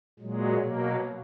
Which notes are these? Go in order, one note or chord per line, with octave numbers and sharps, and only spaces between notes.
A#2 F#3 G#3
B2 F#3 A#3